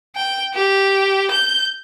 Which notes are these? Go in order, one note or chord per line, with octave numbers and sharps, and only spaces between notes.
G5
G4
G6